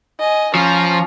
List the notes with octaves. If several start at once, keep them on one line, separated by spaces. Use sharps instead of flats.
D#5 G#5
F3 C#4 A#5